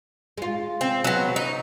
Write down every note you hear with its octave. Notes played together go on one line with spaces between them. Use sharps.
G#3 F4
C4
F#3 B3
D#4